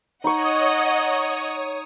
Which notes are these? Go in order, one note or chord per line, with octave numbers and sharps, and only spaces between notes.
D#4 C#5 D#5 F#5 C#6 D#6